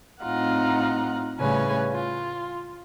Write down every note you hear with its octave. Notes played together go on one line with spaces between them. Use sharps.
A2 C4 D#4 F4 F#5 A#5
A2 C#3 G3 B4 C#5 G#5
F4